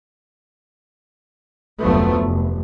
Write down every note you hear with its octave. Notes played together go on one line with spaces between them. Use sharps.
F1 D2 F3 F#3 A3 B3
F1